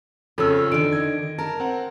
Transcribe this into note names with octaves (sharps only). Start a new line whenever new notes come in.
F2 C#3 F4 A4 C#5 E6
D3 D#3 D7
D#5 G#6
A#4 A5
C4 F#5